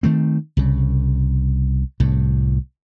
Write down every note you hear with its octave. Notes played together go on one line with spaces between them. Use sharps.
D#3 A3 C4
C2 C#3
C2 A2